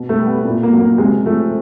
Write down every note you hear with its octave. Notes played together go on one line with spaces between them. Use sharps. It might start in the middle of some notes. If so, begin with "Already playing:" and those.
Already playing: B2
A3
G3
B3
A#2
A#3
F#3
A#3
C3 G#3
F3 A3